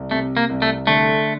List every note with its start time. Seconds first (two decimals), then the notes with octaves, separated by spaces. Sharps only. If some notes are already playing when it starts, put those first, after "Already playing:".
Already playing: C2
0.11 C3 A3
0.37 A#3
0.50 C2
0.62 A3
0.87 D3 A3